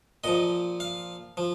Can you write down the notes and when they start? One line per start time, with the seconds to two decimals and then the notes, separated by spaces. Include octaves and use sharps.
0.24 A#2 F3 D#5
0.80 F5
1.37 F3